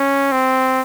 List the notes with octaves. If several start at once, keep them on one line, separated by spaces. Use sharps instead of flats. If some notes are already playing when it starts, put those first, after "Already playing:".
Already playing: C#4
C4